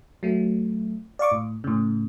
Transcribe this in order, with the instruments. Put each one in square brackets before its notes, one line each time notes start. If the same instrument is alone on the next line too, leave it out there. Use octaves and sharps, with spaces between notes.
[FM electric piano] F#3 A3
D5 F5 C#6 D6
A2
A2 C#3